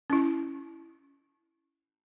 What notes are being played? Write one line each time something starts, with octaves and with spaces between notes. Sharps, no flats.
C#4 E4